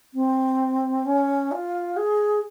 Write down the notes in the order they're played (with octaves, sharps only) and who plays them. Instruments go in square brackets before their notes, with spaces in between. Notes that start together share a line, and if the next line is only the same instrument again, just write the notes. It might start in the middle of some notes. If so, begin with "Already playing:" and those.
[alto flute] C4
C#4
F4
G#4